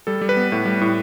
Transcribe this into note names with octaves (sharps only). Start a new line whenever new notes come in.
G3 A4
G3
B4
B3
A2
G3
A2